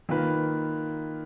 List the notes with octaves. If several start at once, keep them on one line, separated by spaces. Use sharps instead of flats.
D#3 A#3 F4 B4